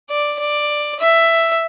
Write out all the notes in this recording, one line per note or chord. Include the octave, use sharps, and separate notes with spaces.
D5
D5
E5